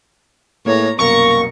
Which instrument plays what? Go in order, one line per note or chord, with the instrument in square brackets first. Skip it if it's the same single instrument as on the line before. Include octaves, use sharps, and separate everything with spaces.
[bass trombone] A2 [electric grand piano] A#3 G#4 B4 [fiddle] C#5 A#5
[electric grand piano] C2 F#2 B2 [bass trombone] A#3 [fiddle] A#4 A#5 [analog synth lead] C#6